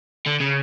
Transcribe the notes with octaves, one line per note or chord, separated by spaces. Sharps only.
D3
C#3